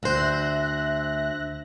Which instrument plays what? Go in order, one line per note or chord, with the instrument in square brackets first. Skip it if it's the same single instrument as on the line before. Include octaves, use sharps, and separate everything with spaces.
[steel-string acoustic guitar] D2 C5 [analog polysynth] E5 F#6 A#6